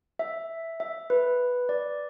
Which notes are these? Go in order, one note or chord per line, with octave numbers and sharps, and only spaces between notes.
E5
E5
B4
D5